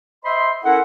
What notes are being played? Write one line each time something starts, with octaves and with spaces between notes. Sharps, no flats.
C5 D#5 E5 B5 C6
C#4 E4 A4 A#4 F#5